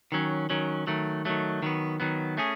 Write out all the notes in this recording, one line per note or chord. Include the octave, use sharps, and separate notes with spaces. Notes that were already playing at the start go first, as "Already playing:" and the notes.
D#3 F#3 C#4
D#3 F#3 C#4
D#3 F#3 A3
D#3 F#3 A3
D#3 F#3 B3
D#3 F#3 B3
A3 C#4 G#4